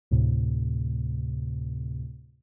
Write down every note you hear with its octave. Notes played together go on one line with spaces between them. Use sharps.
D2 A2 C3